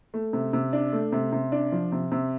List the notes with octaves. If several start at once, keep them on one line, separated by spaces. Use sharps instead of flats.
A3
C3
C3
D4
A3
C3
C3
D4
F3
C3
C3